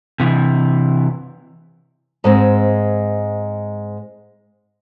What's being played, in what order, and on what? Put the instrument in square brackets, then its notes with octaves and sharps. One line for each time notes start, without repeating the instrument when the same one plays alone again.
[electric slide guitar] C3 E3
[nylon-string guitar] G#2 G#3 C4